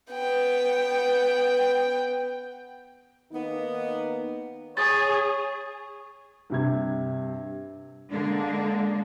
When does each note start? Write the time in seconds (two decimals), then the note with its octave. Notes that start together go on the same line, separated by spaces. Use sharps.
0.11 B3 G5
3.33 D#3 A#3 B3 D#4
4.77 G#4 C#5 D#6 A6
6.50 G2 C3 G#6
8.11 D3 G#3 A#3 D4